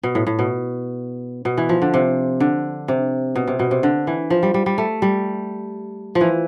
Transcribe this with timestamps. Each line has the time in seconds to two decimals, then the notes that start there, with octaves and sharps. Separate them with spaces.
0.03 B2
0.15 A2
0.27 A2
0.39 B2
1.45 B2
1.57 E3
1.69 F3
1.82 D3
1.94 C3
2.40 D3
2.88 C3
3.36 B2
3.47 C3
3.59 B2
3.71 C3
3.83 D3
4.07 E3
4.30 F3
4.43 G3
4.54 G3
4.66 G3
4.78 A3
5.02 G3
6.15 F3
6.21 E3